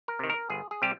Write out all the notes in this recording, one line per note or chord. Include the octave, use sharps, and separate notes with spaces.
A#4
C3 D#3
A#4
G1 G#4
G#4
C3 G3 G4